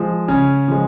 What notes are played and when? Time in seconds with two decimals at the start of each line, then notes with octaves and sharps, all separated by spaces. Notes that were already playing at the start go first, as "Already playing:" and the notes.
Already playing: F3 G#3
0.28 C#3 C#4
0.68 F3 G#3